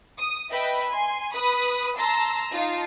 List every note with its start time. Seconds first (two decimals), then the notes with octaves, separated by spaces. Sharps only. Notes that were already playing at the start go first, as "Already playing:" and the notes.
0.18 D#6
0.51 B4 D#5 E5 G5 B5
0.91 G#5 C6
1.33 B4 B5 D#6
1.98 A5 A#5 C6 E6
2.53 D#4 F4 A5